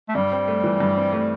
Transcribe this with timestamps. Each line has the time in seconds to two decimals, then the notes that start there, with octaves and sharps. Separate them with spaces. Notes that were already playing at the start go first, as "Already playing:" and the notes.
0.09 A3
0.15 G2 G3
0.32 C4
0.48 A3
0.64 E3
0.80 G2
0.97 C4
1.13 A3